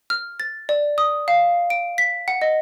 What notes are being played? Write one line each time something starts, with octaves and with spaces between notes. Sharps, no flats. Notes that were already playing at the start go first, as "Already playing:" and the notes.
F6
A6
D5
D#6
F5
D7
B6
F#5
D#5